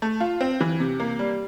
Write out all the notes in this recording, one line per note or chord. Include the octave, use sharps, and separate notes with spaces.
A3
F4
C4
E3
C3
A#3
G3